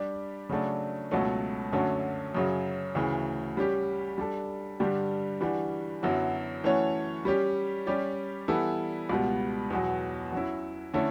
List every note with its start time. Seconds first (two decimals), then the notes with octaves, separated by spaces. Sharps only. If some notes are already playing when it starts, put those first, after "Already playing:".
Already playing: G3 D4 G4 D5
0.49 C#3 F#3 A3 D4
1.11 C#2 B2 F#3 A3 C#4
1.72 F#2 D3 F#3 A3 C#4
2.35 F#2 C#3 F#3
2.95 D2 C#3 E3
3.57 G3 C#4 G4
4.18 G3 D4 A4
4.80 G2 D3 G3 D4 G4
5.41 E3 G3 D4 F#4
6.03 F#2 D3 F#3 B3 E4
6.64 E3 A3 C#4 F#4 C#5
7.25 G3 C#4 G4
7.87 G3 C#4 G4 D5
8.48 E3 G3 B3 E4 A4
9.09 C#2 B2 G3 B3
9.70 E2 B2 F#3
10.32 F#3 C#4 E4
10.94 D3 A3 C#4 E4